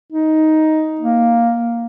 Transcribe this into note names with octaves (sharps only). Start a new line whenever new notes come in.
D#4
A#3